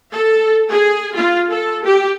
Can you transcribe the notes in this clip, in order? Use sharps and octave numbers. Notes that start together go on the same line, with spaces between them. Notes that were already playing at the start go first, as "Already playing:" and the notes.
A4
G#4
F4
A4
G4